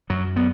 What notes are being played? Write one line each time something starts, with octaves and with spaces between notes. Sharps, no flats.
F#2 F#3
B3